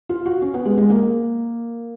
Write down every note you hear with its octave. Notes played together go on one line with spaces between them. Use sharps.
F4
F#4
C#4
B3
G#3
G#3
A#3